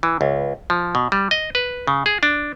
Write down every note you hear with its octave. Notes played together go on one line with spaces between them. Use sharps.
E3
C#2
F3
B2
G3
D#5
B4
C#3
G#4
D4